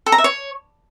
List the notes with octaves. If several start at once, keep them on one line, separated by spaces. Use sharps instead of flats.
A4
A#5
E5
C#5